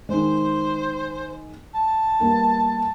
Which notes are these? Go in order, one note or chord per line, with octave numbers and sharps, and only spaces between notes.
D#3 G#3 C5
A5
G3 A#3 B3